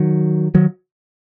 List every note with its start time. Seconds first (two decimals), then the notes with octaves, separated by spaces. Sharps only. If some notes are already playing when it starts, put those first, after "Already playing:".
Already playing: D#3 F#3
0.55 D#3 F#3